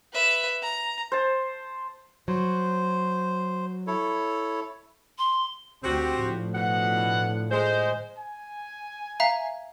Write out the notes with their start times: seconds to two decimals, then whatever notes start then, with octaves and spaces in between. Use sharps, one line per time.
0.12 B4 E5
0.62 A#5
1.12 C5 A5
2.28 F#3 C5
3.87 E4 A4 C#5
5.18 C6
5.84 D2 C4 F#4 G4
6.19 A2 D3 F3
6.55 B2 F#5
7.51 G#3 C5
8.18 G#5
9.20 E5 F5 A#5